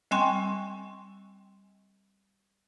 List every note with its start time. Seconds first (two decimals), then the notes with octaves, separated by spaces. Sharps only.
0.11 G3 C4 G5 G#5 C6 C#6